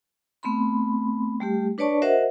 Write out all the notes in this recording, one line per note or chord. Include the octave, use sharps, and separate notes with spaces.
A3 B3 C4 B5 C6
G3 A3 G4
D4 B4 C#5 D5 A5 C#6
F#4 A#4 C5 D#5 E5 F#5